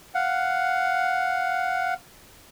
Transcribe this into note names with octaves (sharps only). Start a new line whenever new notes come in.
F5 F#5